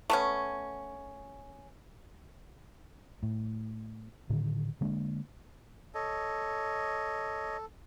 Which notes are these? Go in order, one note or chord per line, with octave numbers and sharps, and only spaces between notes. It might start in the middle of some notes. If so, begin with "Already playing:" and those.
A3 B3 C#4
A2
A2 D3 D#3
D3 G#3 A#3 D4
A4 C#5 D#5